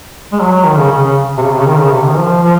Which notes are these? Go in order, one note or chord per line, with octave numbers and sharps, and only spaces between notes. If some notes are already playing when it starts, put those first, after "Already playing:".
G#3
F#3
D#3
C#3
C#3
C#3
C3
C#3
C3
C#3
D#3
C#3
C3
D#3
F3
F3